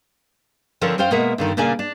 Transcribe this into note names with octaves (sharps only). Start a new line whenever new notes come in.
D3 F3 C4 C#4 A#4 C#5
F#2 C#4 C5 F5 G5
B2 G#3 A#3 A#4 E5 F#5
G2 D3 D#3
A#2 C#3 A#3 D4 D5 G#5
D4